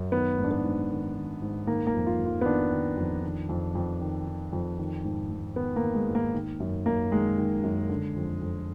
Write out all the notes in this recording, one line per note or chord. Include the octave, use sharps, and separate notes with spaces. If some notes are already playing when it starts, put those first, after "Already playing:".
Already playing: F#2
D#3 B3
G#2
D4
B3
G#2
D#3
D#3
G#2
D#3 A#3
A#3
F2
F4
F2
F4
B3
D#3 D4
D#3
F2
D#3
F2
F2
D#3
D#3
F2
D#3
G#2
G#2
D#3 B3
A#3
D#3
G#3
G#2
A#3
D#3
F#2
F#2 A#3
D#3 G#3
D#3
F#2
D3
F2
F2